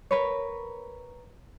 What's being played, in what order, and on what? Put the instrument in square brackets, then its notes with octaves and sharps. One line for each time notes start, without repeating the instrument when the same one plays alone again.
[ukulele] A#4 B4 C#5